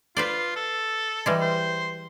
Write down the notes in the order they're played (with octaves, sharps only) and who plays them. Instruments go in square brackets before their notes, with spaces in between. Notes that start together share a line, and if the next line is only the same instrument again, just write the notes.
[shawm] F4 [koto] B4 C5 D5
[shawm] A4
[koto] E3 G3 G#3
[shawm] C5